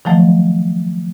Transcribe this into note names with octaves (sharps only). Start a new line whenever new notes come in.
D#3 F3 F#3 A3